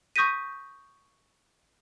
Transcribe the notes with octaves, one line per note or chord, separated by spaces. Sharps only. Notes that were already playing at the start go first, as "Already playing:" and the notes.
C#6 D#6 G6 A#6 B6 D#7